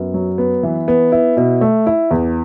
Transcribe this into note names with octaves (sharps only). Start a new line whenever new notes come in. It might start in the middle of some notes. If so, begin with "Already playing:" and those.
Already playing: F#2 B3
F#3
B3
E3
B3
E4
B2
A3
E4
E2